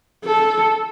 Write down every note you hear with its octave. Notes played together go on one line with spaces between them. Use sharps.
A4